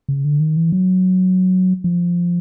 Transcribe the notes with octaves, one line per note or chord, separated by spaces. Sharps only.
C#3
D3
D#3
E3
F#3
F3